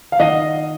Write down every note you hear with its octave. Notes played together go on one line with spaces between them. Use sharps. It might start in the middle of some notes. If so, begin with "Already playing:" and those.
F5
D#3 D#5 F#5